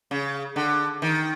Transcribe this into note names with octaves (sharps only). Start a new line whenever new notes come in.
C#3
D3
D#3